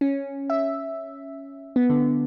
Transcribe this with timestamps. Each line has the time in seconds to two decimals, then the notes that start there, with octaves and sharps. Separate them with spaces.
0.01 C#4
0.50 E5
1.76 B3
1.89 D3